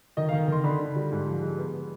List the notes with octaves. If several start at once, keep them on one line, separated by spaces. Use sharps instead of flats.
D#3 D#5
D#3 F5
D#3 C6
D3 B5
D3
G3
G#2
F3
G#3
B3